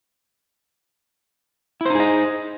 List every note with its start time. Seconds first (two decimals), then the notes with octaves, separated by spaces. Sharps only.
1.81 E4
1.86 C5
1.90 D#4
1.95 G#4
2.00 D#5